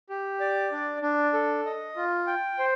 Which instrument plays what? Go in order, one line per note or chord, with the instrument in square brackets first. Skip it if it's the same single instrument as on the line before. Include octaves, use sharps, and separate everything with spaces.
[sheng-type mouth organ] G4
D5
D4
D4
A4
D#5
F4
G5
C5